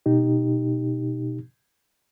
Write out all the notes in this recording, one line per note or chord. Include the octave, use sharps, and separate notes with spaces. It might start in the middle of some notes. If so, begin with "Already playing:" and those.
B2 D#4 G4